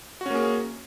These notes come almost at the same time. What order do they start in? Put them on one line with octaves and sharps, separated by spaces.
F#4 C#4 A#3 G#4